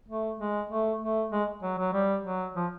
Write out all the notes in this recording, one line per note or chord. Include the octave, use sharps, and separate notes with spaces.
A3
G#3
A3
A3
G#3
F#3
F#3
G3
F#3
F3